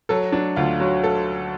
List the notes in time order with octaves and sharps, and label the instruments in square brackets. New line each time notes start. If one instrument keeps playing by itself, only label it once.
[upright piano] F#3 A4
F#3 D4
D2 F4
F#3 F#4
A4